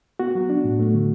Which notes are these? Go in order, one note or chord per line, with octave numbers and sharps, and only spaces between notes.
B3 F#4
F#3
D4
A2
A3
D3